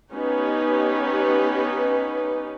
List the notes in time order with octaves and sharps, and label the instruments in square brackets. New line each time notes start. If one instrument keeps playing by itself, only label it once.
[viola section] B3 C#4 D#4 G4 B4